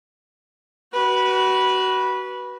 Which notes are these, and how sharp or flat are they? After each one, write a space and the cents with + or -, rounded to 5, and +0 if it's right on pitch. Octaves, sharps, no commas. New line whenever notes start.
F#4 +25 B4 -15